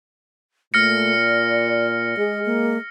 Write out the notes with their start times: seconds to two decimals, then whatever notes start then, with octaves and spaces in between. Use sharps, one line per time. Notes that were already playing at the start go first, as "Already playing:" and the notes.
0.74 A#2 A3 F6 A#6 C#7
1.19 D5
2.17 G#3 G#4
2.46 A#3